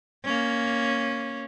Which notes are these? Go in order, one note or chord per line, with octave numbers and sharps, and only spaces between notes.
A#3 C#4